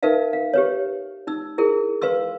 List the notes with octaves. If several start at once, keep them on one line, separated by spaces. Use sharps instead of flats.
D#4 A#4 B4 E5 F5
F5
G4 B4 C#5
D#4 E6
E4 G#4 A#4
B4 F5 C6 E6